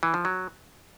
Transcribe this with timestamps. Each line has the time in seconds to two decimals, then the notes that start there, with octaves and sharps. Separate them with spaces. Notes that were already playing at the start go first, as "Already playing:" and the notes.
0.03 E3
0.14 F3
0.25 F#3